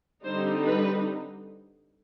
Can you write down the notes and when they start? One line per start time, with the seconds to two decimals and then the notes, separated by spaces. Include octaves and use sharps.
0.24 D3 G3 C4 D#4 C5
0.63 B4